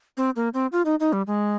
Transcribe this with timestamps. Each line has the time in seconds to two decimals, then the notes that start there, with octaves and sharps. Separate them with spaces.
0.17 C4
0.36 A#3
0.54 C4
0.72 F4
0.85 D#4
1.00 D#4
1.13 G3
1.27 G#3